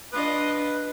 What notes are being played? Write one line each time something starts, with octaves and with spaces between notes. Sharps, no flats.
D4 F4 B4 D#5